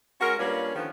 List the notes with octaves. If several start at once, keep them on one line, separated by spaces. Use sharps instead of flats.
G#3 C#4 F#4 A#4
G2 A#3 C#4 D4 F4 B4
D3 D#3 F3 B3 C#4